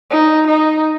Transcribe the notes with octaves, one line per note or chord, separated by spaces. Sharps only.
D#4
D#4